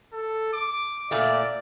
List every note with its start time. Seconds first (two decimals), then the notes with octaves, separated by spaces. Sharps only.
0.13 A4
0.53 D6
1.11 A#2 A3 D5